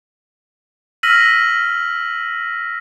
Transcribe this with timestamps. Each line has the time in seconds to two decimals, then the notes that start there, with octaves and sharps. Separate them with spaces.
1.03 E6 F6 A#6 B6 D#7 F#7